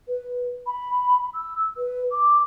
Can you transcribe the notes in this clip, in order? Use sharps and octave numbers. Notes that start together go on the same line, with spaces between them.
B4
B5
E6
B4
D6